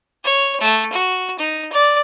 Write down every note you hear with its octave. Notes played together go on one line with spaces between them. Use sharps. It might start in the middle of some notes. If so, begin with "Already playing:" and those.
C#5
A3
F#4
D#4
D5